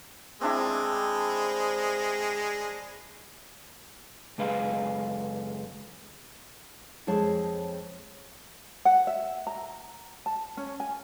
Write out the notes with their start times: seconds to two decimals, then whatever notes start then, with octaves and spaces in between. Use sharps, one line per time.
0.41 G#3 C4 D4 E4
4.38 C#2 F#2 G#3 B4 F5
7.07 F2 G#3 C#5 A5
8.85 F#5
9.07 E5
9.47 A#5
10.26 A5
10.57 C#4
10.80 G#5